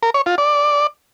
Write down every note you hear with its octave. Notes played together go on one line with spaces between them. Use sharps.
A#4
C#5
F4
D5